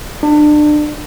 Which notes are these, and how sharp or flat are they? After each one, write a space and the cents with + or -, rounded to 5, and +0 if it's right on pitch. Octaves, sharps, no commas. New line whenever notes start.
D4 +30